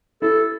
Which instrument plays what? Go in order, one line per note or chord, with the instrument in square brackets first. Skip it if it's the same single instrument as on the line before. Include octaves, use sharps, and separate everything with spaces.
[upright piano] E4 [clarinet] A4